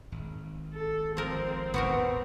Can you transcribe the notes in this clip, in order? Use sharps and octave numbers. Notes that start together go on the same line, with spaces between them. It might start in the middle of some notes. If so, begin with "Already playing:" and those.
G#1
A4
F3 C4 A#4
D#1 G#1 B3 F#4 A#4